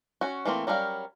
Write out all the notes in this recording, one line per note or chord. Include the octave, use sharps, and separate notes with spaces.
C#4 F#4
E3 A3 A#3 C4
F#3 G3 C#4 A#4 F5